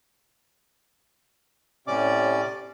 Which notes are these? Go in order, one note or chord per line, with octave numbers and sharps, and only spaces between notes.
A2 C3 C#4 D5 D6